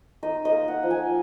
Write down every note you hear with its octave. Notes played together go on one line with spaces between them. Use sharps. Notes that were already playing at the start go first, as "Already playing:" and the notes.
D#4 D#5
D#5
A#3
F#5
F3
G#5